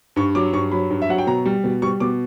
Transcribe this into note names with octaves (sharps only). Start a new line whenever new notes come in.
G2 C#6
F#3 D6
G2 C#6
F#3 B5
G2
E5
F#3 F#5
G5
B2 A#5
G3
B2
G3 C#6
B2 D6